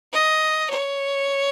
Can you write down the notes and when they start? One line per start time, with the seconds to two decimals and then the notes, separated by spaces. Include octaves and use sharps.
0.13 D#5
0.70 C#5